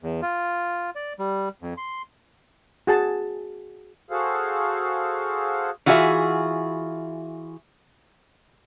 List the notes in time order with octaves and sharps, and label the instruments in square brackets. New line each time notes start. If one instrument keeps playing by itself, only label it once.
[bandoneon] E2
F4
D5
G3
F2
C6
[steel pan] F#4 G#4 A5
[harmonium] F#4 G#4 A4 C5 F5
[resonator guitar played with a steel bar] E3 F4 F#4 G#4 C#5 E5